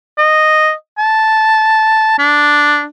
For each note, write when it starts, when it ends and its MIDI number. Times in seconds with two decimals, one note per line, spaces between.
0.18 0.72 75
0.98 2.14 81
2.19 2.85 62